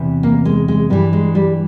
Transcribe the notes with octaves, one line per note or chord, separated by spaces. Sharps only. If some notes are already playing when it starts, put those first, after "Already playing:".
Already playing: E2 C3 E3
A#3
G#3
G#3
G2 E3 G3
G#3
G3